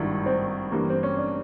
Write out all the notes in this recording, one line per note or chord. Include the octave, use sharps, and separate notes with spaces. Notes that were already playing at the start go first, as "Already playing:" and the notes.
Already playing: G#1 G2 D#3 D#4 E4
C4
G2 E3 G3 A#3
C4
C#4
D4